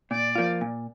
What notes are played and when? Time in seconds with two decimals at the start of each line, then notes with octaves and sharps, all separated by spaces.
0.11 A#2 D5
0.35 F3 A#3 F4
0.61 A#2